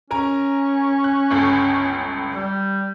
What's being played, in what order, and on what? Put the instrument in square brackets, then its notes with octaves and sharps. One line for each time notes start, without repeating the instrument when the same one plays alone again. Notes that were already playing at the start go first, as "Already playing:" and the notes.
[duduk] C#4 [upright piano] A#4 G#5 A#5
[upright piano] F#6
G1 C#2 A4
[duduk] G3